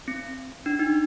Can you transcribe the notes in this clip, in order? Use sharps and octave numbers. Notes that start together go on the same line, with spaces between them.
C4
D4
D#4